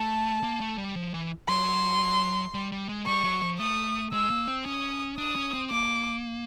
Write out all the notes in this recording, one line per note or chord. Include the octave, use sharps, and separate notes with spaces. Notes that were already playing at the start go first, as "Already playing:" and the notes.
Already playing: A3 A5
A#3
A3
G3
F3
E3
F#3 C6
G3
G3
G#3
G3 C#6
F#3
F3
A3 D#6
G#3 E6
A#3
C4
C#4 D#6
D4 D#6
C#4
C4
A#3 D6